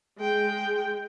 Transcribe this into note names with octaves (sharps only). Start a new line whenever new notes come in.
G#3 G5